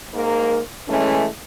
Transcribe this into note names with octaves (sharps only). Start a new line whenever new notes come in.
G#2 A#3 A#4
E3 G#3 A3 C#4